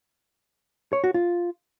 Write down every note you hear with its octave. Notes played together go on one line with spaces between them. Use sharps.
C#5
F#4
F4